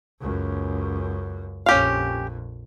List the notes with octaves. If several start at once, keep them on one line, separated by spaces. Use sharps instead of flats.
C#2 F#2
A#1 F2 C#4 G4 F5